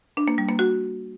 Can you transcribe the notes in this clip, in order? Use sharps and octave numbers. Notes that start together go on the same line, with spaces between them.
D4
A#3
G3
A#3
F#4